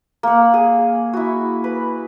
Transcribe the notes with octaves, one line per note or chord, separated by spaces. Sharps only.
A#3 F#5
G#4
E4 F#4
B4